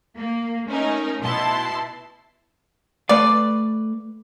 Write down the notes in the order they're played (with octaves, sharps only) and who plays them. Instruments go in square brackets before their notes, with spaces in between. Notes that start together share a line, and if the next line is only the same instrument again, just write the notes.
[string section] A#3
A3 C#4 D#4 A#4
B2 E4 A5 C6
[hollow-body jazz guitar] A3 B4 F5 [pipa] D5